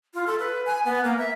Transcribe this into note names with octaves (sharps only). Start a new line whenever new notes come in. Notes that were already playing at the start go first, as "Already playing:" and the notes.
F4
A4
B4
G#5
B3
A#3
E5